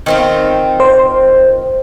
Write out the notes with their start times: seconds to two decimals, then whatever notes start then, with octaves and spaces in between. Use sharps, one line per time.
0.06 D#3 C4 F4
0.80 C5